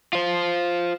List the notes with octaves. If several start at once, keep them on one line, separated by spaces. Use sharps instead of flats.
F4 C5